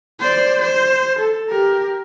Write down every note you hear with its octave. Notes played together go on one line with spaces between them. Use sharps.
C5 D5
C5
A4
G4 A#4